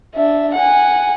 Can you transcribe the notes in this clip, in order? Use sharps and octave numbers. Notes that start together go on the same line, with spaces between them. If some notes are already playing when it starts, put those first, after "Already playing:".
D4 E5
F#5 G#5